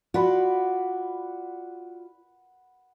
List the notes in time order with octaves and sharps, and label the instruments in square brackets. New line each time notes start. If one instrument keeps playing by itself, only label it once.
[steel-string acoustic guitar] F4 F#4 D5 [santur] F#5 B5